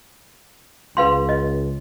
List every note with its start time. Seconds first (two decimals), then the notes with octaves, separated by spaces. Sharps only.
0.97 C#2 B4 F5 C6
1.29 D#5